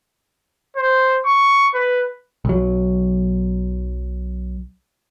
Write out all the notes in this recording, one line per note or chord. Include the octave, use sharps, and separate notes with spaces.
C5
C#6
B4
B1 F#3